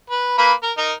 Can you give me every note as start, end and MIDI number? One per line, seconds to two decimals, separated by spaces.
0.10 0.35 71
0.38 0.53 58
0.38 0.53 71
0.38 0.53 83
0.63 0.72 70
0.78 0.93 63
0.78 0.93 70